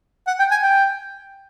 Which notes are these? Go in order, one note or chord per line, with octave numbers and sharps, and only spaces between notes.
F#5
G5
G#5
G5